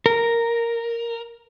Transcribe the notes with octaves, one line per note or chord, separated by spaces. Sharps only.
A#4